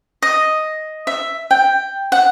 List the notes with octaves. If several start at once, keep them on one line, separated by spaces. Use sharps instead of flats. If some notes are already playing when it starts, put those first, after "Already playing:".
D#5
E5
G5
F#5